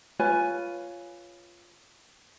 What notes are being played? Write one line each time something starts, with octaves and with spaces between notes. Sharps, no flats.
F4 B4 C#5 G#5